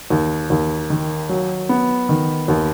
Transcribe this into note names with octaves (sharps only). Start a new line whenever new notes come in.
D#2
D#2
D#3
F#3
B3
D#3
D#2